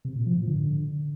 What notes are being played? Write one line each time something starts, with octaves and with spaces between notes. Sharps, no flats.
C3
A#2
F3
A2
D3